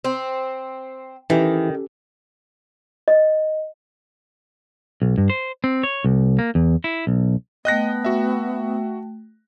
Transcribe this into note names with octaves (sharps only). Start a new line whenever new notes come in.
C4
D#3 E3 C#4 G4 A4
D#5
B1
G2
C5
C4
C#5
C2
A#3
E2
E4
B1
A3 B3 D#5 G5 F#6 A#6
F#4 E5